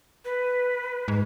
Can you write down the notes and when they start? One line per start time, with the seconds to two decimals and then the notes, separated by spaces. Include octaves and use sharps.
0.25 B4
1.08 G#2